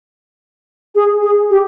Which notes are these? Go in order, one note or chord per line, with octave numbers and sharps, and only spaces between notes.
G#4
G#4
G4